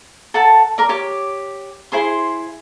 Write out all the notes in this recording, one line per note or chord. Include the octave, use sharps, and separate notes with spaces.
A4 F#5 A5
A#4 D5
G4 C#5 D6
E4 G#4 C5 C6